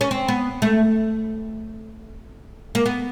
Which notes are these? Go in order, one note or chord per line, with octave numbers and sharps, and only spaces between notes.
C#4
C4
B3
A3
A#3
B3